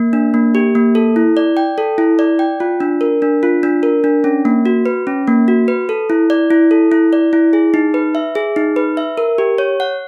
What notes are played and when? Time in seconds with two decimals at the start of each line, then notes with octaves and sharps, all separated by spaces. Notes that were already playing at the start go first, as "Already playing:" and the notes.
Already playing: A#3
0.13 D4
0.34 A#3
0.55 G4
0.75 A#3
0.95 A4
1.16 E4
1.37 D5
1.57 G5
1.78 A4
1.98 E4
2.19 D5
2.39 G5
2.60 F4
2.80 D4
3.01 A#4
3.22 D4
3.43 F4
3.63 D4
3.83 A#4
4.04 D4
4.24 C#4
4.45 A#3
4.66 F#4
4.86 B4
5.07 C#4
5.28 A#3
5.48 F#4
5.68 B4
5.89 A4
6.10 E4
6.30 D5
6.51 E4
6.71 A4
6.92 E4
7.13 D5
7.33 E4
7.53 G#4
7.74 D#4
7.94 B4
8.15 E5
8.35 G#4
8.56 D#4
8.76 B4
8.97 E5
9.17 A#4
9.38 G4
9.58 C#5
9.80 F#5